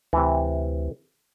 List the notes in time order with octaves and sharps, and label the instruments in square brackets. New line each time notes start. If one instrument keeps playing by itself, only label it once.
[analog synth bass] D2 [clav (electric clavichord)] C3 E3